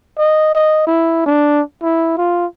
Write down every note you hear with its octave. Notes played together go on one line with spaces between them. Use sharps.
D#5
D#5
E4
D4
E4
F4